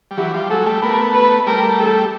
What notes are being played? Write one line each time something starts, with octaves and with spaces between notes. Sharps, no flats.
G3
E3 F#3 G4
F3 G3
F#3 G#3 A4
G#3
G3 A3
A3 B3 A#4
B4
G3 A3 A#4
A4